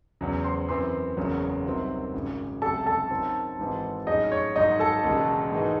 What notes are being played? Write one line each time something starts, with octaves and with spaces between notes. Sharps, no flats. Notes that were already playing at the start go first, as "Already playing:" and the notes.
E2 C#3 F#3
C5 C6
F#2 E3 C4 C5 C6
F#1 E2 C#3 F#3 C#4
C2 C3 D#3 F#3 C4
G#1 F#2 C#3
C#2 C3 F#3 A3 A4 A5
A4 A5
F#2 D#3 F#3 C4
G#1 G#2 E3 C4
A2 F#3 C#4 D#4 G#4 D#5
C#5
G#1 G#2 F#3 D#4 D#5
A4 A5
E1 D#2 C#3 G#3
G#2 E3 G#3 D#4